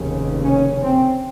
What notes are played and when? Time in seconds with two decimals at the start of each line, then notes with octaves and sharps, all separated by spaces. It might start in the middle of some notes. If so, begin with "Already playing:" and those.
Already playing: F1 D#2 C#3
0.45 C#4
0.83 C4